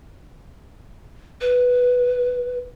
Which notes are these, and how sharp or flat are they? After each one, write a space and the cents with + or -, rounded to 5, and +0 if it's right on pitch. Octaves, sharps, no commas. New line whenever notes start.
B4 +0